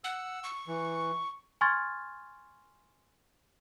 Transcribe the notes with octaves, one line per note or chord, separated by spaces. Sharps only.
F#5 E6
C#6
E3
G#5 C6 C#6 F6 G#6 A6